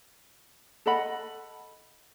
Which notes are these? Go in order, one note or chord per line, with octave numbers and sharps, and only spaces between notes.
A4 D#5 F#5 B5